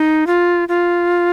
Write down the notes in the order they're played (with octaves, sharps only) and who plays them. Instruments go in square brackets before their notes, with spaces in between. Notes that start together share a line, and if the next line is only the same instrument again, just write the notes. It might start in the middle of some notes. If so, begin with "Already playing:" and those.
Already playing: [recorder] D#4
F4
F4